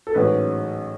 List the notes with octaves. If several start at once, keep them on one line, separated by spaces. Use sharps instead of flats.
A4
A1 G#2 F#3 C#4 B4